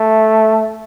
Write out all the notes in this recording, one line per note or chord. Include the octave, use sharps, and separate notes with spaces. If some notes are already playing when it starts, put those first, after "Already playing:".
Already playing: A3